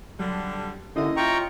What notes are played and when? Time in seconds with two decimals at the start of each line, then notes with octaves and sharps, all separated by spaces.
0.20 D3 F#3 G3
0.96 D#2 D3 C#4 E4 D#5 E5
1.17 F4 G5 A#5 C#6